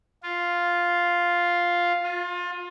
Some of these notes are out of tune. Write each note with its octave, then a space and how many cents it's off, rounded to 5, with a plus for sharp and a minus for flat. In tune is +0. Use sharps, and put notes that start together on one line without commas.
F4 +0
F4 +30